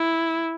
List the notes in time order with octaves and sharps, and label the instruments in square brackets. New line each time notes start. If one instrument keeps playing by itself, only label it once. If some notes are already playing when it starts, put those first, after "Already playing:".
Already playing: [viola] E4